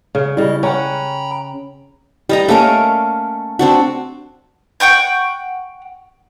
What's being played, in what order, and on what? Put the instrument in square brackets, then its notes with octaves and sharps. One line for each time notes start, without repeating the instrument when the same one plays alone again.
[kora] C#3
[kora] C#3 G3 [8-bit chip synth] E4 D#5
[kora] C#4 F#5 [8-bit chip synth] G5 A#5 B5
[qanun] G3 D#5 A#5
A3 A#3 C#4 A#4
C4 D4 F#4
[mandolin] F#5 G5 C#6 G6